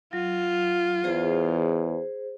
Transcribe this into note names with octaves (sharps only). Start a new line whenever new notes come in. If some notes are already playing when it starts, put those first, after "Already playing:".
F#3 F4
E2 G#4 C5